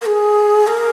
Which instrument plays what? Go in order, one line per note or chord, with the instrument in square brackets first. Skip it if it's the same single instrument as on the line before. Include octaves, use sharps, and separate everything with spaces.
[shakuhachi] A#4
G#4
A#4